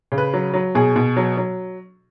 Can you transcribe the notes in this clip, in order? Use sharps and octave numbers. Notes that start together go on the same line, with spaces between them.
C#3
B4
F#3
F#3
B2 G#4
B2
F#3
F#3